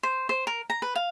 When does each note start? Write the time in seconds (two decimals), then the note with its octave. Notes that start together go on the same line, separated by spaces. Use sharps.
0.03 C5
0.29 C5
0.47 A#4
0.70 A#5
0.82 B4
0.95 F5